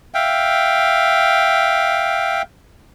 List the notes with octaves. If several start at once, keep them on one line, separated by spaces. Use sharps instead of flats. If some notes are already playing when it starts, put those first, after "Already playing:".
E5 F5 G5